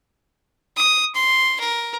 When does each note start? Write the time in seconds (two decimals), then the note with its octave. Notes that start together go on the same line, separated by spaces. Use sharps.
0.77 D#6
1.15 C6
1.60 A#4